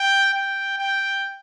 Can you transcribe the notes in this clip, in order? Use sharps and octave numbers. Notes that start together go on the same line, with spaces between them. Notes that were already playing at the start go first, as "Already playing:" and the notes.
Already playing: G5
G5
G5